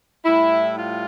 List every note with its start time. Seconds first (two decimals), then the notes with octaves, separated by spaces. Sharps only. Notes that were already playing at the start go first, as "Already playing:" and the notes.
0.25 A2 G3 E4
0.77 F4